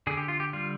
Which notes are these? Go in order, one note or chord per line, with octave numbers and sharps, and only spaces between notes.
D3 G#4
G4
F4
G4
G3 F4